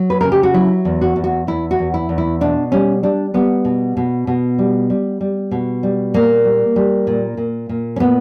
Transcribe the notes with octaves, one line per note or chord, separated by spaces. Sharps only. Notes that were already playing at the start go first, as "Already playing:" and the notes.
Already playing: F#3
B4
C#3 A#4
G4
F#4
F#3 E4
E2
F#4
E2
F#4
E2 E4
F#4
E2
E4
E2
E4
B2 D4
G3 C#4
G3 D4
G3 B3
B2
B2
B2
G3
G3
G3
B2
G3
A#2 A#3
G3
G3
A#2
A#2
A#2
C#4
A#2 B3